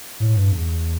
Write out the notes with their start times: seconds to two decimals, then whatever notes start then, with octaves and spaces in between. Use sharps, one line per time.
0.20 A2
0.36 G2
0.52 E2